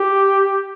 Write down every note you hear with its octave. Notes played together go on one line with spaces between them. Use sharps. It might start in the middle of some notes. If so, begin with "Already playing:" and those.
Already playing: G4